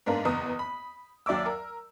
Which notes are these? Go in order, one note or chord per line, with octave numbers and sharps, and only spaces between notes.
G#2 A#3 B3 D4 A#4
F#1 E2 B3 A#5 D#6
B5
D#2 F#3 D5 E5 D6 E6
A#4